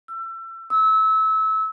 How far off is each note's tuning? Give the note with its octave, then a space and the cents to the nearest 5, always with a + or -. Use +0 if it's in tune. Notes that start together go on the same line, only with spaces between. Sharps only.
E6 +30
E6 -25